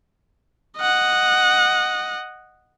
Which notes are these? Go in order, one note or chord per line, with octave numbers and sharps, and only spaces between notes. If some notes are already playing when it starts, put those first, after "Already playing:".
D#5 F#5